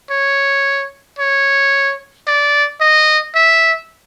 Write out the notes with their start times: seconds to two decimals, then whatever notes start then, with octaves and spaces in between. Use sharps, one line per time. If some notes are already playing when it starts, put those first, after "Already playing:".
0.10 C#5
1.19 C#5
2.27 D5
2.81 D#5
3.35 E5